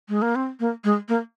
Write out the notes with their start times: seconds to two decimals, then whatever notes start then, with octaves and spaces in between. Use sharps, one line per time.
0.09 G#3
0.22 A#3
0.35 C4
0.60 A#3
0.84 G#3
1.09 A#3